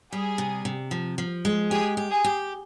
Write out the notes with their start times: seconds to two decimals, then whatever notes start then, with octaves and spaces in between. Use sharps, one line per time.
0.12 G3 G#4
0.38 C3
0.65 C3
0.91 F3
1.18 F3
1.45 G#3
1.70 G4 G#4
1.97 G4
2.11 G#4
2.24 G4